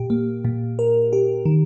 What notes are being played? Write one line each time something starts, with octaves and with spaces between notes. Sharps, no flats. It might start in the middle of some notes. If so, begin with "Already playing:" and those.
Already playing: A#2 G4
A#3
A#2
A#4
G4
D#3